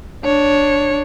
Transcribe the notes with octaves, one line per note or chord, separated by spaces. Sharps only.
D4 C#5